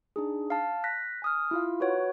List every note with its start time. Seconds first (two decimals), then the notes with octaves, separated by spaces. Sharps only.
0.16 D4 D#4 G#4
0.50 F5 A5
0.84 F#6 A#6 B6
1.22 G#5 D#6 F6
1.51 E4 F4 F5
1.80 F#4 B4 C#5 F#5